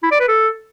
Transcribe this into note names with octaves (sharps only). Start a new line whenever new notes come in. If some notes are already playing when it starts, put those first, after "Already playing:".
E4
D5
B4
A4